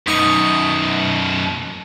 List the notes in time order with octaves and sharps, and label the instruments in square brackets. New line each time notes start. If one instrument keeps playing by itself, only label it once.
[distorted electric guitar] F#2 B2 [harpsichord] D#4 C#6